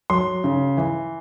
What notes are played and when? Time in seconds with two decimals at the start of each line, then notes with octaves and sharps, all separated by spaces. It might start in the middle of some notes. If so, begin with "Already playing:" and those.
0.10 F#3 C6
0.44 C#3
0.77 E3